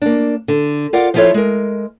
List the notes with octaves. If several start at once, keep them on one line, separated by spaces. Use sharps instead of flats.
A#3 D4
D3
F4 A#4 D5 F5 F#5
F3 G3 E4 F4 A4 C#5
G#3 A#4